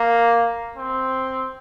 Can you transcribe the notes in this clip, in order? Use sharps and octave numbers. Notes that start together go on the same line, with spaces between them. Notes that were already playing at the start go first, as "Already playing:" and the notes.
Already playing: A#3
C4